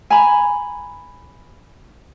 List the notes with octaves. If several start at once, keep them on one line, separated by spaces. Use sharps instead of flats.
G#5 A#5 B5